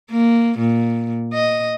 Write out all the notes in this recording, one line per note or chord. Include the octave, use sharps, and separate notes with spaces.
A#3
A#2
D#5